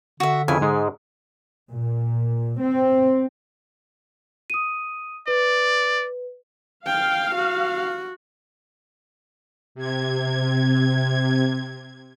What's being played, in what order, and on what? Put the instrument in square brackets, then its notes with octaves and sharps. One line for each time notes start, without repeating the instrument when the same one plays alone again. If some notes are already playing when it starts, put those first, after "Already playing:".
[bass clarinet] D3 [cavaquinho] F#4 E5
[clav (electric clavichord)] F2 C#3 E4 [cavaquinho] G#5
[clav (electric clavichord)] G#2 G#3
[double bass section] A#2
C4
[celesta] D#6 D#7
[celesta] B4 [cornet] D5
[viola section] F5 [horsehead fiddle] G5
[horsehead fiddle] F#4
[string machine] C3 G#6